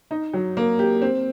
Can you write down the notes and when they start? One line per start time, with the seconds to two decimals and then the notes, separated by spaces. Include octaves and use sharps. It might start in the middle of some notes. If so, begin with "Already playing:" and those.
0.11 D#4
0.34 F#3
0.57 A#3
0.79 G4
1.02 C4